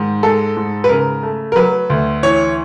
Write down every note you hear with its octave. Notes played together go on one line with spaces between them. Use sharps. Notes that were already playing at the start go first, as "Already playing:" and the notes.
Already playing: G#2 D#3
G#3 A4
G#2
B4
C#3 A#4
A3
A#4
F#3 B4
D2
E3 C#5